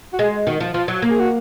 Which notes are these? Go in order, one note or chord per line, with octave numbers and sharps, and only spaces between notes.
F#4
G#3 G#4
D#3 F#4
F3
F3 F4
F#3
A#3
G#4
F#4